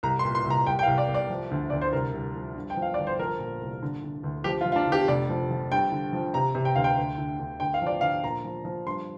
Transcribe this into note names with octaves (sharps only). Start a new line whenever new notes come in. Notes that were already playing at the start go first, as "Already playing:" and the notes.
C2 A#5
C6
A#2
C6
C2
A#5
C2 G5
G5
F5
C2
D5
C2
D5
F3
D2
D2 D5
C5
C2 A#4
C2
F3
G2
G5
F3
F5
G1 D5
C5
F3 A#4
A#2
C2
D3
D3
D2
F3 G4
F4
F3
F4
D4
D3
G4
F1 D5
F3
F3
G2 G5
D3
F3
C3 A#5
C3
G5
D2 F5
G5
D2
D3
D2
D2 G5
F5
F3 D5
D3 F5
A#2 A#5
F3
F3
G2 C6